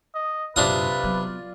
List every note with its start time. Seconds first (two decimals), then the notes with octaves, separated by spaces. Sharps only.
0.15 D#5
0.56 A#1 F#2 C3 D4 F4 B4 D5 D#6
1.04 F#3 B3